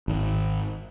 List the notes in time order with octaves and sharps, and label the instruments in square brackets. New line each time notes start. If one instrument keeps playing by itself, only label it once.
[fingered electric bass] G#1